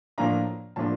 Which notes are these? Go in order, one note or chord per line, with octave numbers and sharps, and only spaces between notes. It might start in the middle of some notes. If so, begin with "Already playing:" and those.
A2 F3 A#3 D4 F4 A#5
A2 F3 A#3 D4 F4 A5